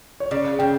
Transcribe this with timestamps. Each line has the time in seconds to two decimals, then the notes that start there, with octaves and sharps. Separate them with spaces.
0.20 C#5
0.31 C#3 D5
0.59 C#3 G5